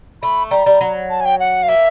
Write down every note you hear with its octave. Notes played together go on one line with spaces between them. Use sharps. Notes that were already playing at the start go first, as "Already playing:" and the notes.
A3 B5
G3 A#5
G3
F#3
A5
G#5
G5
F#5
F5
A#3 E5